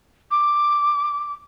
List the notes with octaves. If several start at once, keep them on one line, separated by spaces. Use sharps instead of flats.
D6